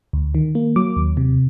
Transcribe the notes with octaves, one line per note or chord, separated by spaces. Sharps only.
D2
D#3
A#3
F#3 D6
D#2
C3